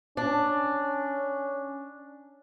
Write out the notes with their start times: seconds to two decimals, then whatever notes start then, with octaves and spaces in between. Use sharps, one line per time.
0.17 C#4 D4